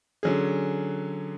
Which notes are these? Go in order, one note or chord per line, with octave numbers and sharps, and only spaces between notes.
D3 F#3 C#4 G#4